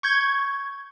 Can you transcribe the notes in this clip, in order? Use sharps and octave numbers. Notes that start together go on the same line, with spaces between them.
C#6 G6 G#6